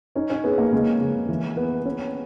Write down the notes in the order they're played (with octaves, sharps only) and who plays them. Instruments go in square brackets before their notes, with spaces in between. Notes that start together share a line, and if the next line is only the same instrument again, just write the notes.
[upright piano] C#4 [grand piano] D#4
[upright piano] C#4
[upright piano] B3 [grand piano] G#4
[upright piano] A#3
[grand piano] C#3 [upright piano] G#3
[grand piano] C#3
E3
B3
C#4